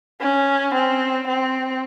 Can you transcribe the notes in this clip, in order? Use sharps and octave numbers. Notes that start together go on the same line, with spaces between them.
C#4
C4
C4